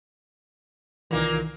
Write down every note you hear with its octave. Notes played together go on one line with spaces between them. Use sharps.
C2 A#2 D#3 E3 A#3